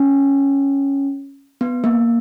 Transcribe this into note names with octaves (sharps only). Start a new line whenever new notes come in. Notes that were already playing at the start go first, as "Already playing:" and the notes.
Already playing: C#4
B3
A#3